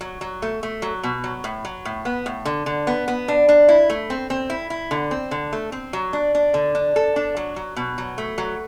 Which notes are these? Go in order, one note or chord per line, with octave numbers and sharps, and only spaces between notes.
F#3
F#3
A3
A3
F#3
B2
F#3
A2
F#3
A2
B3
A2
D3
D3
B3
B3
D4
D4
E4
A3
C4
C4
E4
E4
D3
C4
D3
A3
C4
F#3
D4
D4
D3
D4
A4
D4
F#3
F#3
B2
F#3
A3
F#3